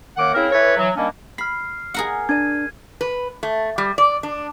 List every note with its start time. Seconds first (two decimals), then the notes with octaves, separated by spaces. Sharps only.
0.17 F#2 D#3 A#3 F#5 D6
0.34 C#3 C4 E4 A#4
0.52 E3 A4 B4 C#5
0.78 E3 F#3
0.96 D#3 G3 A#3 C#4 D4
1.38 B5 F6 C7
1.94 G#4 A#4 F#5
2.29 D4 D5 G#6 D#7
3.01 B4
3.43 A3
3.78 G3
3.98 D5
4.23 D4